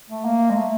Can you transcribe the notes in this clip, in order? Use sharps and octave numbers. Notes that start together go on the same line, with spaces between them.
A3
A#3
G#3
A3